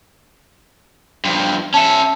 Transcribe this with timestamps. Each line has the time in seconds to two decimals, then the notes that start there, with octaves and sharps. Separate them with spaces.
1.25 G2 F3
1.74 C#4 E5 A5 C#7